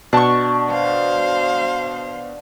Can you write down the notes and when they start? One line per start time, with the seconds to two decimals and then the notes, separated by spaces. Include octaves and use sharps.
0.13 B2 D4 A5 C#6
0.71 C5 F5